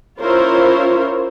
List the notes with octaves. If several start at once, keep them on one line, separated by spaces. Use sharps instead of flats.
C#4 E4 F4 A#4 C5 C#5